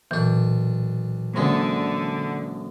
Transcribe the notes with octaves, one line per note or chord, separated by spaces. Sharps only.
B1 A#2 E3 D4
A#1 F#2 D3 G#3